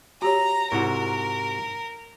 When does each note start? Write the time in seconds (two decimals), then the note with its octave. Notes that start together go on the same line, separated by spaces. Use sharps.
0.22 F#4 G4 C#5 A#5
0.72 G#2 C3 E4 F#4 A#4